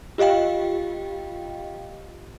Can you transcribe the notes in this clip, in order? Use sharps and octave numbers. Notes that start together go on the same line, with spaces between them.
F4 G4 D#5 F5 G5